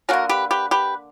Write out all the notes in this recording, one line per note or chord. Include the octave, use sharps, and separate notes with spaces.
D3 A#3 C#4 F#4 A#4
G4 B4
G4 B4
G4 B4